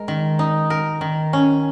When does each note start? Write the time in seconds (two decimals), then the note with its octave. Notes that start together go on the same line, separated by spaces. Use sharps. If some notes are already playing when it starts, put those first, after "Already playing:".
Already playing: G#3 A#4
0.08 D#3
0.39 D#4
0.70 A#4
1.01 D#3
1.33 C#4